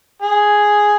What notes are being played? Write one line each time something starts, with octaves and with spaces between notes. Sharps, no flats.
G#4